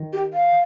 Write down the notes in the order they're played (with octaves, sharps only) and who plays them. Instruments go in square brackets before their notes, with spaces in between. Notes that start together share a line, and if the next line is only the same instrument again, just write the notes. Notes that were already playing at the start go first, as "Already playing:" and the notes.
Already playing: [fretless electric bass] D#3
[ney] G4
F5